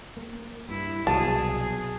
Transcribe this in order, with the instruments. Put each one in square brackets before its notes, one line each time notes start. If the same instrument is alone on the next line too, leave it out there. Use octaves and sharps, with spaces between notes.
[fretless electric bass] A#3
[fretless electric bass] G2 [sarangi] E4
[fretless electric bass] C2 B2 F#3 [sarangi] G#4 [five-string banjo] A5